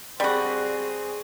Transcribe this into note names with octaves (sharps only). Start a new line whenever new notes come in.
G3 C4 F#4 G#4